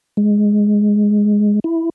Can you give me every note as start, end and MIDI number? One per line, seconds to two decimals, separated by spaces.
0.17 1.60 56
1.64 1.90 64